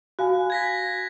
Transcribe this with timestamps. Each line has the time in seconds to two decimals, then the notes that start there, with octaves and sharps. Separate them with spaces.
0.19 F#4 F5 G#5 F#6
0.50 G#6 A#6 B6